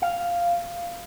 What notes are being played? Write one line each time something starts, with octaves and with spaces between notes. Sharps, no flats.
F5